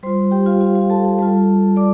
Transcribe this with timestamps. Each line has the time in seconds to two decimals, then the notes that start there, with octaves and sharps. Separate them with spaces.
0.03 G3 F4 C5 C6
0.31 G4 G5
0.46 F4 F5
0.61 F4 F5
0.75 F4 F5
0.90 A4 A5
1.05 A4 A5
1.18 G3 F4 A4 A5
1.77 D5 D6